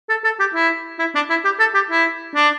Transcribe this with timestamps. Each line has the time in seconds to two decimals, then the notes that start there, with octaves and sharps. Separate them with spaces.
0.09 A4
0.24 A4
0.39 G4
0.54 E4
0.99 E4
1.15 D4
1.29 E4
1.44 G4
1.60 A4
1.74 G4
1.90 E4
2.35 D4